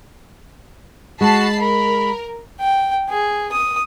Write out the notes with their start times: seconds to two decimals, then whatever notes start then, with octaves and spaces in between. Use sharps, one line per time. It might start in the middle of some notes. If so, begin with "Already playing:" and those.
1.21 G#3 F#4 A5 B5 C7
1.62 A#4 B5
2.60 G5
3.09 G#4
3.52 D#6